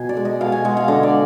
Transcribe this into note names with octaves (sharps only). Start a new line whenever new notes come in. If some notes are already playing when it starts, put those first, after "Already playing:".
Already playing: B2 G#5
D5
G#3
D#5
B2 F5
G#5
G#3 F#5
F5
D3 D#5
D5